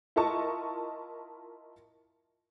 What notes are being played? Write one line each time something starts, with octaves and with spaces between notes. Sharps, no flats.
E4 F4 A#4 D#5 A5 C#6